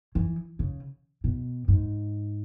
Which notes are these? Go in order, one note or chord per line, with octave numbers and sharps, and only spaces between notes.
E3
C#3
B2
G#2